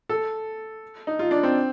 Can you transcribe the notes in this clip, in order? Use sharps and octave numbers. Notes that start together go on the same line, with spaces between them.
A4
D#4
F4
D4
C4